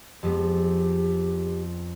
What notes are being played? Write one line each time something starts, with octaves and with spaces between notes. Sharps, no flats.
F2 G#3 B3 G4